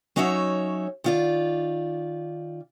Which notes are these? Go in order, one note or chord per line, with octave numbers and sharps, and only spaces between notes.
F#3 C#4 D#4 C#5 E5
D#3 F4 D5